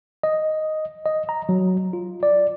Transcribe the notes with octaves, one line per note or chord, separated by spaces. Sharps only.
D#5
D#5
A#5
F#3
F4
D5